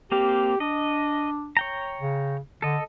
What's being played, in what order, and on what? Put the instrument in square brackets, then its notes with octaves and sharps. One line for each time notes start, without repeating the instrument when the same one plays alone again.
[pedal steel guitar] A#3 C4 F5 [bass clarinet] G4
[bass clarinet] D4 [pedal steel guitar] D#5
[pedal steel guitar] C#5 G5 A#5
[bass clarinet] C#3
[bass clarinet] D3 [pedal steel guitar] A4 D#5